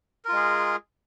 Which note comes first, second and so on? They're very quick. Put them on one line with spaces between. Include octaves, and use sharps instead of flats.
A#4 F4 G#3 G#4